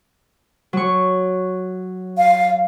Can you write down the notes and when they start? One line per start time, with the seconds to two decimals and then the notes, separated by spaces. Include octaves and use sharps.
0.73 F#3 C#6
2.18 F5